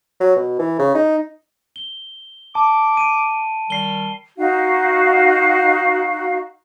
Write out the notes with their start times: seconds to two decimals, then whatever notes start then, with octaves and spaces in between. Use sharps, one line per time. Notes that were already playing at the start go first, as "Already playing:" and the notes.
0.20 F#3
0.36 B2
0.59 E3
0.79 C#3
0.95 D#4
1.76 G7
2.55 A5 D6
2.97 D7 D#7
3.70 D#3 G3 C7 G7
4.37 D#4 F#4 F5